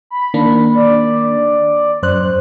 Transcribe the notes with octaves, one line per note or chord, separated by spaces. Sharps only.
B5
D#3 A#3 D4
D5
F#2 C5 F#6